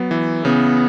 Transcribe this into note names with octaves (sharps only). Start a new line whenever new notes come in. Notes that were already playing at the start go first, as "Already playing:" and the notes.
Already playing: F#3 B3
E3
C#3 B3